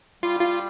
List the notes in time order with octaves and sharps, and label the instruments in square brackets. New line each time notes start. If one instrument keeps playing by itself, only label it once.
[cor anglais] G3 [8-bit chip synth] F4
[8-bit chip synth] F4